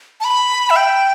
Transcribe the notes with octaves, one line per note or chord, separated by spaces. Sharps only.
A5
B5
E5
G5